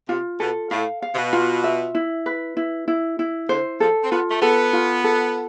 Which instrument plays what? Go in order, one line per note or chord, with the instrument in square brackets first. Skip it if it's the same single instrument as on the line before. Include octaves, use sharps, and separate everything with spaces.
[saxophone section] C3 [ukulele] F4
[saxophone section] B2 [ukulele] A4
[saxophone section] A2 [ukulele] F5
[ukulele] F5
[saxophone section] C3
B2
[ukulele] F4
E5
E4
B4
E4
E4
E4
[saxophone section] D3 [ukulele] C5
[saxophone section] F3 [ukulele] A4
[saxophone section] C4
[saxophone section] B3 [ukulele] F4
[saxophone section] A3
[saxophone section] B3 [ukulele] A4
[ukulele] F4
A4